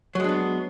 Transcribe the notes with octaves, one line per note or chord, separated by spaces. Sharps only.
F#3 G#3 B3 D4